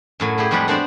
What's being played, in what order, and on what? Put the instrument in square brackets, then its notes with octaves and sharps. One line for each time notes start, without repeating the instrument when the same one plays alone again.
[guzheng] F#2 A2 F#3
A3 E4 G4 G#4
F2 A2 G3 G#3 B4 F#5
B3 D4 F#4 C5 D5